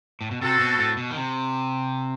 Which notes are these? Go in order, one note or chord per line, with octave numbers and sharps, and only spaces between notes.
A2
B2
C3 C4 F#4 A4
B2
A2
B2
D#3
C3